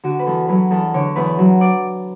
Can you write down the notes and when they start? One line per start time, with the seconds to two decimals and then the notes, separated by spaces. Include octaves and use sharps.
0.04 D3 F#4
0.19 B4
0.26 E2 A4
0.48 F#3 B4
0.71 E2 A4
0.94 D3 C#5
1.16 E2 B4
1.39 F#3
1.61 D5